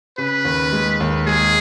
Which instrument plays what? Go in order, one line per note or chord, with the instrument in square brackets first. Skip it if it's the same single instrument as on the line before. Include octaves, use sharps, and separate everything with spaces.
[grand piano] C#3 [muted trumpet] B4
[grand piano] D#2
G#3
D#2
[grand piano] G#3 [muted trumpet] G#4